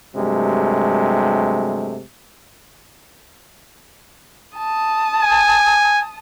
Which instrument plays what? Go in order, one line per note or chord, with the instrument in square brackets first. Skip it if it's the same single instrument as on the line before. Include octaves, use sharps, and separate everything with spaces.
[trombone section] G2 C3 F#3 G#3 A3
[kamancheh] A5 D#6
[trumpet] G#5